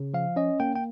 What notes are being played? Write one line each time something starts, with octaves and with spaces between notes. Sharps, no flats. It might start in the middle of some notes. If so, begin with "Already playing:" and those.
Already playing: C#3
F3 F5
C#4 D#5
A#3 G5
G5